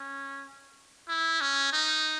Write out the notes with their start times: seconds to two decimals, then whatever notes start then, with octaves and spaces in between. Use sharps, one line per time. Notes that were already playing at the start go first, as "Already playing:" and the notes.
Already playing: C#4
1.08 E4
1.41 C#4
1.73 D#4